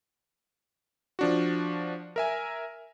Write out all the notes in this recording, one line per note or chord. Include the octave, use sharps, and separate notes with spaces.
F3 D4 F#4
A#4 E5 G#5